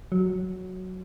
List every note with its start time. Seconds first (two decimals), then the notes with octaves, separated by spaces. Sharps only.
0.12 F#3